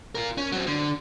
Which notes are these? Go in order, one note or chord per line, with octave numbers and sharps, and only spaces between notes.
F4 A#4
C#4
F#3 C4
D3